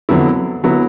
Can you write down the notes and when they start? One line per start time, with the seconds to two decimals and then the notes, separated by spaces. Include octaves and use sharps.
0.09 F2 D3 F#3 B3 E4
0.64 D3 F#3 B3 E4